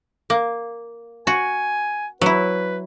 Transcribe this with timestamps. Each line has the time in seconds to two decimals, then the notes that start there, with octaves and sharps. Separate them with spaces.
0.30 A#3
1.27 F#4 G#5
2.22 F#3 E4 B4